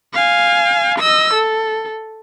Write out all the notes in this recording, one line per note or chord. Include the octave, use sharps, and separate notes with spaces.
F5 G#5
D#5 E6
A4